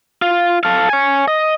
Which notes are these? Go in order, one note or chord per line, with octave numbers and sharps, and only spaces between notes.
F4
A4 F5
C#5 G#5
D#5